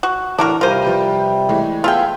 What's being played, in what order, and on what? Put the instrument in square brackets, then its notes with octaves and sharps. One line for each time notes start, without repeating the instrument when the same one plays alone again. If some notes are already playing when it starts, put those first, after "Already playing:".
[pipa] F#4
[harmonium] A2 A#5 [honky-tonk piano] E3 [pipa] D4 F#4 A#4
[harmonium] C3 G3 [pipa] F4 C5 [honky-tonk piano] A#4 D#7
[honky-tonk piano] F3 G4 B4
E3 G#3 A3
[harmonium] B3 A4 [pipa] F4 G5 [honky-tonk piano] G#4 E5